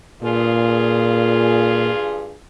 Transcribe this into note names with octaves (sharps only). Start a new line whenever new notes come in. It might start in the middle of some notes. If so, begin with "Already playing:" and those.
G2 A#2 F4 G#4